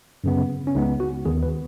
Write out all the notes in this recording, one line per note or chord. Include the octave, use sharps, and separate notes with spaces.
F#2 C#3 B3
C#4
C#2 C#3 G#3 B3 D#4
F#4
D#2 D#3 B3 G#4
B4